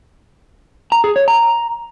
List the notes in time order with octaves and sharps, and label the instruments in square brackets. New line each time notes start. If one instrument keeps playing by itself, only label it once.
[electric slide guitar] A#5
G#4
C#5
A#5